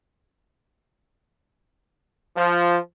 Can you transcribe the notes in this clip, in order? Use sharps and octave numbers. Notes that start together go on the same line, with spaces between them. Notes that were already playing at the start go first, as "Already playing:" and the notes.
F3